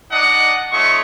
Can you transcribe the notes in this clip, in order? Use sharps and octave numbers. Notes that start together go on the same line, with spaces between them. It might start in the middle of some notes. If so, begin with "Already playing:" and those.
D4 D#4 D5 D#5 F#5
A3 D#4 F4 C#5 C#6